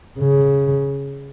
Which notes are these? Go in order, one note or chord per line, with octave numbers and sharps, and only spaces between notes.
C#3